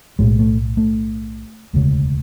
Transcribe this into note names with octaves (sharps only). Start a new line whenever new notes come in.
B1 A2 G#3
A3
A3
E1 D2 C#3 G#3